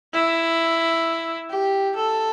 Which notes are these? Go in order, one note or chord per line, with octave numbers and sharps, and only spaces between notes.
E4
G4
A4